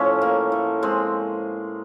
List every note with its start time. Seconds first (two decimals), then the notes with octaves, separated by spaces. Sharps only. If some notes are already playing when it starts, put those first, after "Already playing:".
Already playing: A2 F3 C#4
0.22 A#3
0.52 A2
0.83 G#3 C4